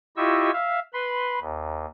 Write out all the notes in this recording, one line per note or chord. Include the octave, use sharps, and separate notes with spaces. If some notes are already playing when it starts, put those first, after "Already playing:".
E4 F4 G4 D#5 C#6 E6
E5 F5
B4 B5 C6
D#2